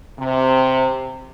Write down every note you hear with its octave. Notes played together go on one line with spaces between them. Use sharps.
C3